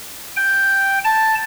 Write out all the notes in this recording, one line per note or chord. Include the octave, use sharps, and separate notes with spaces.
G5
A5